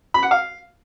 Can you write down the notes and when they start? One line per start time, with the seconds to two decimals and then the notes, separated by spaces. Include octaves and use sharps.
0.14 B5
0.23 F#5
0.31 F5